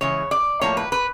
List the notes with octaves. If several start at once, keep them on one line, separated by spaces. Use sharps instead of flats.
C#3 E3 G#3 C#5
D5
A2 F3 A#3 C#5
B4
B4